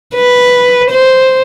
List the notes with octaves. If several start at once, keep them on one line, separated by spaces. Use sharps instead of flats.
B4
C5